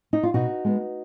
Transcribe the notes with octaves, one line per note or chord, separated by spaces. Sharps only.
D#4
F4
B2 D#4 F#4
G#3 B3